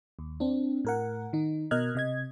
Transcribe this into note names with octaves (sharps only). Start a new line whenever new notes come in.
D#2
C4 D4
A2 A#4 F#5
D#3 D#4
B2 A#4 D#5 F6 F#6 G#6
C3 D#5 G#6